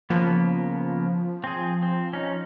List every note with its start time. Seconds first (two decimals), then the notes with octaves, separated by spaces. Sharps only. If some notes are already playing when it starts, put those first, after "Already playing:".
0.10 C#3 F3 A#3 B3
1.44 C4 G#4
1.83 C4
2.13 C#4 D#4